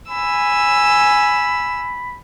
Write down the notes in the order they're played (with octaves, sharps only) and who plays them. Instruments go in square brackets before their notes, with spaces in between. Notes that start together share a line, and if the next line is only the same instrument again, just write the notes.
[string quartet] G#5 E6 [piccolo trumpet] B5